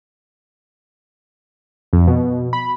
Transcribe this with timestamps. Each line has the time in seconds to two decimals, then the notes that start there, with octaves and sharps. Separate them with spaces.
1.93 F2
2.08 B2
2.53 B5